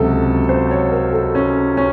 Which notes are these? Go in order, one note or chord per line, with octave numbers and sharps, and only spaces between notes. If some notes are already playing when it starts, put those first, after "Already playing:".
Already playing: C#2 C3 F#3 A4
C5
C#5
A#4
A4
C#4
C#4